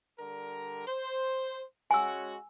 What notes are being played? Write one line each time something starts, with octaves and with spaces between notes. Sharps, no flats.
D3 G3 A#4
C5
G#3 C#4 F#4 G#5 E6